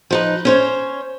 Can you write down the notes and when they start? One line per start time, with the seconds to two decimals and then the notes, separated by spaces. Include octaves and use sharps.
0.11 F3 D#4 B4
0.45 C#4 C5 C#5